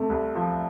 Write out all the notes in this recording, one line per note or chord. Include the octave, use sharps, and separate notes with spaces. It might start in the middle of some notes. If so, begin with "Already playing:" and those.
Already playing: C3 A3
C2
F3